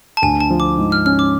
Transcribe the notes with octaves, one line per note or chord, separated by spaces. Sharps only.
A5
D2 G#5
A5
F3
D6
G#2
F6
C#4 F6
D6